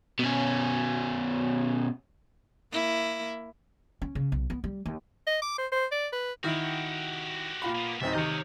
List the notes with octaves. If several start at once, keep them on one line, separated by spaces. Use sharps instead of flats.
B2 C#4
A#3 E4
C#4
C#3
B1
B3
G3
D#2
D#5
D6
C5
C5
D5
B4
D#3 E4 F#4 G4
A#2 F4 B5
A#3 B3
D1 C4 D#4 E5
C3 D#3 C#5 D#5